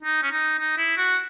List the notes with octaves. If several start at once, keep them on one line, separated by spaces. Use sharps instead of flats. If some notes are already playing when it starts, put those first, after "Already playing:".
D#4
C#4
D#4
D#4
E4
F#4